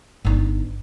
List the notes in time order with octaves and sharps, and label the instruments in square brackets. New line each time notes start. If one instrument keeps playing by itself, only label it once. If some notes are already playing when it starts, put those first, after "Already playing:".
[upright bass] G1 D#4